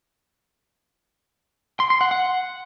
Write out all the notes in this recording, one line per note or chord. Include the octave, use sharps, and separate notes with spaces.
C6
C6
F#5
F#5